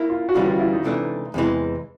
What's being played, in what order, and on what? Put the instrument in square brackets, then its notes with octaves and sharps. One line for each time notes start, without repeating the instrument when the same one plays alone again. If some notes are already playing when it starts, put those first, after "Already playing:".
Already playing: [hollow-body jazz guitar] A#3 [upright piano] E4
[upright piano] F4
F#4
[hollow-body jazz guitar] D2 C#3 E3 G3 [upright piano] F4
[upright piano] F4
E4
D#4
[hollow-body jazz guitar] C#2 C3 E3 A3 D4
E2 C3 E3 G#3